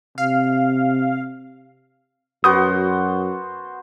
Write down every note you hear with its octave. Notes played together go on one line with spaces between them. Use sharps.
C3 F5
F#2 B3 F#4 C5 D#6 G6